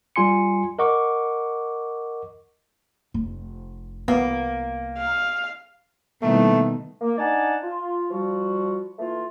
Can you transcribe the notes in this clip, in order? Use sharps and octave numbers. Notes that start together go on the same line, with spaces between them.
G3 F4 G#5 C6 C#7
A#4 D#5 F#5 C#6 D6
F1
C2 A#3 B3
F5
B2 D#3 G3 A3 A#3 E4
A#3
D4 D#4 D5 F#5 G#5 A5
F4
F3 G3 F#4
E3 A3 A#3 F4